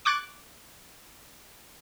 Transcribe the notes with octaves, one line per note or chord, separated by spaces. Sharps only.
C#6 D6 F#6 G#6 A6 D7